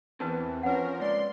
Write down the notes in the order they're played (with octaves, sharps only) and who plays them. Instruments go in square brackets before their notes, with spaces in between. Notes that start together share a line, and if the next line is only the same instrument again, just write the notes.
[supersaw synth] E2 E3 [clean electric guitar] C4 A5 [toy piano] A#4 B4
[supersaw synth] F3 A#4 [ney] C#4 [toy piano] B4 F#5
[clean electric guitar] C#3 G#3 A#3 [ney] D5 [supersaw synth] C6